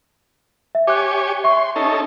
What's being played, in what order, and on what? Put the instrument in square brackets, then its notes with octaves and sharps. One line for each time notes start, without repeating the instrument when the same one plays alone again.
[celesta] E5
[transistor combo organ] G4 C#5 G#5 [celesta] D6 F#6
[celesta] E5 C#6 [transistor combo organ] C6
[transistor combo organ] C#4 D#4 A4